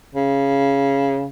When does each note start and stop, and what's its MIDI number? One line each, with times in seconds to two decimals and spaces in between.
0.15 1.28 49